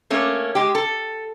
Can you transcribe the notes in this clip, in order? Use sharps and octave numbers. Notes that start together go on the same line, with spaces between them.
A3 A#3 C#4
G#3 G4
A4